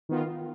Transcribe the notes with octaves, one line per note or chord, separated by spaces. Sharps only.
D#3 B3 F4